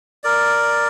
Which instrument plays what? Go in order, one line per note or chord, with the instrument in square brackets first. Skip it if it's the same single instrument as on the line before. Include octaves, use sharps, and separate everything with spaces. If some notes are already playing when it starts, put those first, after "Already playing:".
[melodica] A#4 D5